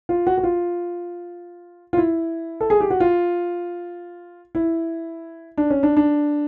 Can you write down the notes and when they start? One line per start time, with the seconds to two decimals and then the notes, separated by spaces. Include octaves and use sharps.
0.09 F4
0.27 F#4
0.38 F#4
0.43 F4
1.93 F4
1.98 E4
2.61 A4
2.70 G#4
2.81 G4
2.90 F#4
3.00 F4
4.55 E4
5.58 D4
5.70 C#4
5.83 D4
5.97 D4